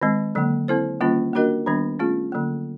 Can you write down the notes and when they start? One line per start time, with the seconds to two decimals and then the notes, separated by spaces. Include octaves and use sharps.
0.02 D#3 G#3 C4
0.35 D3 F#3 A#3
0.68 C4 E4 A4 C5
1.01 D#3 G3 A#3 C#4 F4
1.33 A#3 D4 F#4 A#4 D#5
1.66 D#3 G3 B3 D4
1.99 A3 C#4 F4 G#4
2.32 D3 F#3 A#3